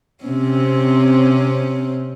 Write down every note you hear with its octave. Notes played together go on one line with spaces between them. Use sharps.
C3 C4 C#4